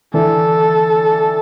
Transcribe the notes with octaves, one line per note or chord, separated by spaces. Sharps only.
D3 E3 A4